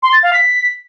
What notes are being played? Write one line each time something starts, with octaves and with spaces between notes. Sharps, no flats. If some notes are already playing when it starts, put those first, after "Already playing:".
C6
A6
F5
B6